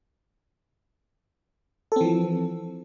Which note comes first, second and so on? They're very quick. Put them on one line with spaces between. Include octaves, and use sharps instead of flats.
A4 C4 E3 F3